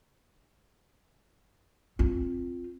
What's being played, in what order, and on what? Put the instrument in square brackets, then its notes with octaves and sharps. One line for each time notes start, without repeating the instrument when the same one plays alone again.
[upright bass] C4 F4